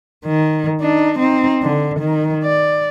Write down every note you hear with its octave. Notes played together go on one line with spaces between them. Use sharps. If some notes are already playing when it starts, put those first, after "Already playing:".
D#3
D4 D#4
C4 D#4
D3
D#3
D5